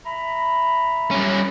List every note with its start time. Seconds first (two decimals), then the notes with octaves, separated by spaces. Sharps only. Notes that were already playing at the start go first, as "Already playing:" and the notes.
0.06 E5 A#5 B5
1.11 G3 C#4